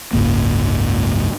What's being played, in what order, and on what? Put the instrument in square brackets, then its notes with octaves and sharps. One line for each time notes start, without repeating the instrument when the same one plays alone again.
[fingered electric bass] F#1 C#2 G#2 A#3